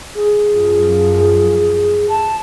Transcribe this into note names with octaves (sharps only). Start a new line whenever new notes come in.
G#4
F#2 F3
A5